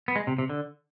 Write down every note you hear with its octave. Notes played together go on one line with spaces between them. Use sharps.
B3
G#3
C3
C3
D3